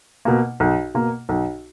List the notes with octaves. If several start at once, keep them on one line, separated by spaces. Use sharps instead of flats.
B2 A#3
B1
B2 A#3
B1